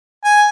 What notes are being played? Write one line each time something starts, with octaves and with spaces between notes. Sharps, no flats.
G#5